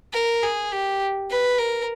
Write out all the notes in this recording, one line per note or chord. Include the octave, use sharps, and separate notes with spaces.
A#4
G#4
G4
B4
A#4